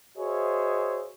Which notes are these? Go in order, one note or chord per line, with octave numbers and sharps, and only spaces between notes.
F#4 G#4 C5 C#5 D#5 E5